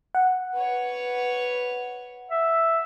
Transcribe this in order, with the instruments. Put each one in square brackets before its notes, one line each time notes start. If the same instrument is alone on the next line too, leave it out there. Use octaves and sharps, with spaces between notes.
[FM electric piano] F#5
[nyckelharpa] B4 C#5
[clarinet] E5